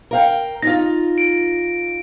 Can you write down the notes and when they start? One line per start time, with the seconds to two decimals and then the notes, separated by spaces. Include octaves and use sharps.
0.11 A#4 F5 G5
0.62 D#4 F4 A#6
1.18 D7